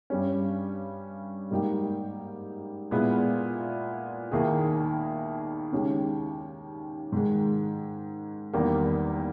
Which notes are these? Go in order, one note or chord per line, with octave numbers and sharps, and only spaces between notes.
G2 G3 C#4
G#2 G3 A#3 D#4 G4
A#2 G#3 B3 E4
D#2 D#3 A#3 E4 G#4
D#2 C#3 G#3 C#4 G4
G#2 D#3 G#3
E2 D#3 G3 A#3